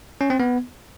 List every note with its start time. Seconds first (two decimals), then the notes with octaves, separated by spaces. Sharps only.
0.21 C#4
0.30 C4
0.40 B3